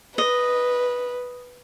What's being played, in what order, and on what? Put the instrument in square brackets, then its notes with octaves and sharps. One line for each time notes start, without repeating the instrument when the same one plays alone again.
[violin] B4 [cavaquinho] D#5